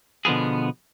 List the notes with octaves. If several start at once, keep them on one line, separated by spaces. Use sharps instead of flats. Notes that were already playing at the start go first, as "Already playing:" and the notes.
B2 D3 F3 B3 G#4